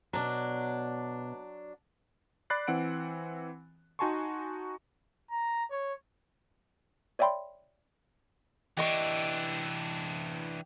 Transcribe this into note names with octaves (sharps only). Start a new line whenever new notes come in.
B2 F#3 D4 A5
D5 B5 F#6 A6 C7
E3 C4 F#5 D7
D#4 F#4 G#5 A5 C6 C#6
A#5
C#5
C#5 D5 E5 G5 B5 C6
E3 D4 G4 D#5 C#6